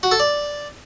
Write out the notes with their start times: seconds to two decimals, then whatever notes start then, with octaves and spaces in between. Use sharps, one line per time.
0.03 F#4
0.11 A4
0.20 D5